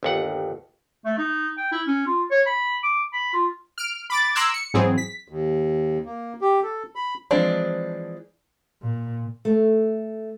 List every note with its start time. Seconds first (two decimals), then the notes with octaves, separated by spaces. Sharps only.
0.03 G1 D#2 F#5
1.05 A3
1.18 D#4
1.58 G5
1.72 E4
1.87 C#4
2.06 F4
2.31 C#5
2.47 B5
2.83 D6
3.13 B5
3.33 F4
3.78 F6 D7
4.10 B5 D6 A6
4.35 A#5 C6 D6 E6 F#6 G#6
4.54 C#7
4.74 G#2 E3 F#3 C4 G#4
4.98 B6
5.28 D#2
6.06 A#3
6.41 G4
6.63 A4
6.95 B5
7.31 E3 F3 G#3 C4 D4
8.82 A#2
9.45 A3